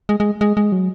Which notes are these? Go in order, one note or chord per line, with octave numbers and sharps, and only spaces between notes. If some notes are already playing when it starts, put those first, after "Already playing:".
G#3
G#3
G#3
G#3
F#3